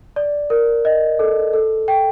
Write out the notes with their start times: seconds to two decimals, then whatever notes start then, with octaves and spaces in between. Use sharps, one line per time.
0.16 D5
0.50 A#4
0.85 D#5
1.19 A4
1.53 A4
1.88 G5